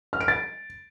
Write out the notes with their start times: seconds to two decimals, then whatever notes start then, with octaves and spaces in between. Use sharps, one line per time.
0.13 F6
0.21 D7
0.28 A6